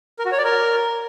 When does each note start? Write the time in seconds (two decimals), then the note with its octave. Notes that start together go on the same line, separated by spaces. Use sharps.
0.19 A#4
0.25 F#4
0.32 C#5
0.38 D5
0.45 A#4